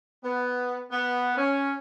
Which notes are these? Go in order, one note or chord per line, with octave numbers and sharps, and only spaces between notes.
B3
B3
C#4